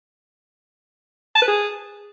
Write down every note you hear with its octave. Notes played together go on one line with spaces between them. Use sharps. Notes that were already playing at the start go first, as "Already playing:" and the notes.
A5
B4
G#4